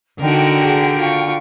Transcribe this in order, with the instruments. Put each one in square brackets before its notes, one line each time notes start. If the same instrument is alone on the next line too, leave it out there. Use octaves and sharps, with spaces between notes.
[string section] D3 [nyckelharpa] D#4 [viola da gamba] F#4 A#4 [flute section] G5
[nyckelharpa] G#4
F4 C#6